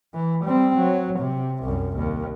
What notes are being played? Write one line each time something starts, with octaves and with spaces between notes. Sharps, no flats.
E3
G3 C4
F#3
C3
C2 F#2
D#2